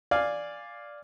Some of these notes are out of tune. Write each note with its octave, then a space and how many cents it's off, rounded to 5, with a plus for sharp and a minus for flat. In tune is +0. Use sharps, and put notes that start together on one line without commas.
D5 +0 F5 +0 G#5 -10